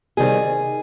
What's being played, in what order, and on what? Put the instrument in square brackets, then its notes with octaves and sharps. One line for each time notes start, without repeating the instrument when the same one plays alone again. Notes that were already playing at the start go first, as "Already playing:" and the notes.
[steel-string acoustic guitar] C3 D#3 G3 C4 G#4